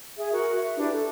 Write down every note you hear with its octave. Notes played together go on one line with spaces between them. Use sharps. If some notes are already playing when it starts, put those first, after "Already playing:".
G#4 E5
F#4 A#4
E5
D4 E4 G4 B4
A4